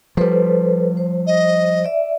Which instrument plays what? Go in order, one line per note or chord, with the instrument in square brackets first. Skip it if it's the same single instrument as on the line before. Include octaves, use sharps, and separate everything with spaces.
[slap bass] F3 G3 [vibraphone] A4 B4 C5
[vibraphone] C5
[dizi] D#5
[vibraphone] D5 E5